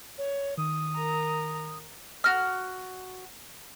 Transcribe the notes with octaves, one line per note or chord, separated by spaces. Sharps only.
C#5
D#3 D#6
A#4 A#5
F#4 F6